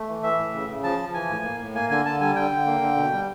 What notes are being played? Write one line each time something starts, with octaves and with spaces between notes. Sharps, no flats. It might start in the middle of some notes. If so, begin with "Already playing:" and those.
Already playing: A3
E3
E3 E5
A2
C#3
C#3
F3 A5
F3
E3 G#5
A2
A#3
A2
A#3 G#5
D3 G#5
D3 A5
G3 G#5
D3 G5
D3
A#3
D3
B2
G3